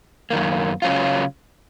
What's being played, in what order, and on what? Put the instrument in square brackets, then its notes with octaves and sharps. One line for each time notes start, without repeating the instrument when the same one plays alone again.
[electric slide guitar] F#2 D#3 A#3
C#3 F#3 C#4 F4